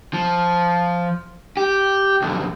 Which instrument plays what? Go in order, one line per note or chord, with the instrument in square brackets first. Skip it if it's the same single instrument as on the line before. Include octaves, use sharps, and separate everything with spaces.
[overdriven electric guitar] F3
G4
B1 F2